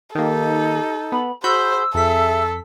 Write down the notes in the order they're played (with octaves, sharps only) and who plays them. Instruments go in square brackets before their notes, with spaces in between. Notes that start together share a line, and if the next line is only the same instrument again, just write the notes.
[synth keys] D#3 A#3 [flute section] D#4 [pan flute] G4 [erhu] A4
[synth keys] B3 [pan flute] B5
[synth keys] F#4 B5 G6 [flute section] G#4 [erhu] C5 [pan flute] E6
[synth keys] F2 B6 [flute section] G#4 E5 [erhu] A4